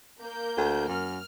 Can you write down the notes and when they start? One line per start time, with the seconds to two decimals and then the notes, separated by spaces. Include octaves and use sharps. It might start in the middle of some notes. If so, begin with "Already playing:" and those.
0.19 A#3 G6
0.57 D2
0.88 F#2 F6